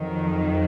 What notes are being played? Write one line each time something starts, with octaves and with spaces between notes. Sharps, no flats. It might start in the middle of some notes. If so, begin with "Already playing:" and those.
Already playing: F2 D#3 F#3